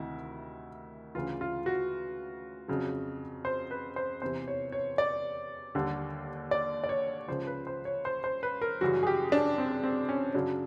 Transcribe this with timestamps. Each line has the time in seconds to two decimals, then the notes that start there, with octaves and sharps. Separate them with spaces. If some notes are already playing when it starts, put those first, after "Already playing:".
Already playing: D2 C3 D#3 E4
1.15 D2 C#3 E3 F4
1.41 F4
1.66 F#4
2.68 F2 C#3 F#3
3.45 C5
3.71 B4
3.96 C5
4.22 E2 C3 E3 C5
4.48 C#5
4.72 C#5
4.98 D5
5.75 D#2 D3 G3
6.51 D5
6.84 D5
6.89 C#5
7.28 C#2 C#3 F3 C5
7.47 B4
7.67 C5
7.85 C#5
8.05 C5
8.24 C5
8.43 B4
8.62 A#4
8.81 F#2 C#3 E3 G3 F#4
9.03 G#4
9.07 G4
9.32 D4
9.58 C4
9.83 C4
10.09 C#4
10.34 F#2 C#3 F#3 D4